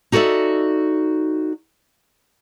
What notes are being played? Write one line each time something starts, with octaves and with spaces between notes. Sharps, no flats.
D#4 F#4 A4 C#5 D5 E5